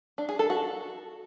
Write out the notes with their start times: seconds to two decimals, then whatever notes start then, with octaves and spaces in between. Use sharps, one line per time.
0.18 D4
0.29 G#4
0.39 A4
0.50 F#4